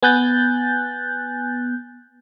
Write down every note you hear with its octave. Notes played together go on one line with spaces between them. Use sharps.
B3 G#5 F#6 G6 A6